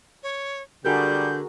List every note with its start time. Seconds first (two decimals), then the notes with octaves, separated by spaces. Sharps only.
0.23 C#5
0.85 D3 G3 F#4 G#4 A#4 G6